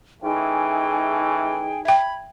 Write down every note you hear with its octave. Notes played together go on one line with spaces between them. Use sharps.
E3 A3 C#4 D#4 G#4 G5
E5 G5 B5 G#6